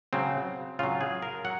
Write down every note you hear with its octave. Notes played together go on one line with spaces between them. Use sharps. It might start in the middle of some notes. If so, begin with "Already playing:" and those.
C#3 F#3 C4
C#3 F#3 F4
G#4
A#4
F#3 F#5